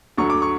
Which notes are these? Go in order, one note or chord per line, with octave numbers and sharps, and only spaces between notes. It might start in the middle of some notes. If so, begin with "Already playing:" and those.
D2 D3 F#3 C#6
D6
C#6